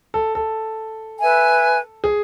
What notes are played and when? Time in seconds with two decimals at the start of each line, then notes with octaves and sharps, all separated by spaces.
0.14 A4
0.35 A4
1.20 B4 E5 G#5
2.04 G#4